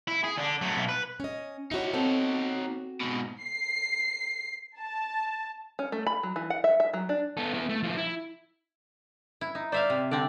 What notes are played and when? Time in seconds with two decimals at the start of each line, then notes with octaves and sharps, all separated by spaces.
0.08 E4
0.24 G#4
0.38 D3 D4
0.61 F#3 A3
0.77 B1 B3
0.89 B4
1.20 C#4 D#5
1.71 D#4 E4 F#4 C#5
1.94 C4 F#4 A4
3.00 G#2 B2
3.42 C7
4.78 A5
5.79 C#4
5.92 A3
6.07 B5
6.23 F#3
6.36 E3
6.50 F#5
6.64 E5
6.80 E5
6.94 F#3
7.09 D4
7.37 B3 A4
7.54 B3 E4
7.69 A3
7.83 F3 E4
7.97 E4
9.41 E4
9.55 D#4
9.72 C5 D5 E5 F5
9.90 C3
10.11 D3 C4 D5